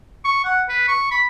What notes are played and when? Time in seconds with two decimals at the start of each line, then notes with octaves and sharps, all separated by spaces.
0.25 C#6
0.44 F#5
0.69 B4
0.88 C#6
1.11 B5